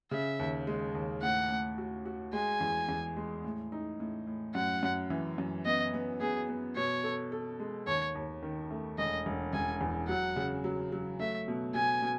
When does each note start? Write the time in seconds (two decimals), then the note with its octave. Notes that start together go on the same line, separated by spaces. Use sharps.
0.11 C#3 E5
0.39 D#2
0.67 G#3
0.95 D#2
1.22 A2 F#5
1.50 A2
1.78 F#4
2.05 F#4
2.33 G#3 G#5
2.61 E2
2.89 E2
3.17 G#3
3.44 A2
3.72 D#4
4.00 A2
4.27 A2
4.55 F#2 F#5
4.83 F#2
5.10 E3
5.38 F#2
5.65 B3 D#5
5.94 B3
6.21 B3 G#4
6.48 B3
6.76 B2 C#5
7.04 A4
7.32 A4
7.60 G#3
7.87 D#2 C#5
8.15 D#2
8.43 D#3
8.71 A3
8.98 E1 D#5
9.26 E1
9.53 E1 G#5
9.81 E2
10.09 F#3 F#5
10.36 C#3
10.64 F#3
10.92 F#3
11.20 A3 E5
11.48 B2
11.74 B2 G#5
12.02 B2